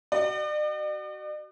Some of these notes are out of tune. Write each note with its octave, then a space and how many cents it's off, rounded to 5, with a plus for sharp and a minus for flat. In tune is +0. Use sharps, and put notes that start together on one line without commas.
F#4 +30 D5 +45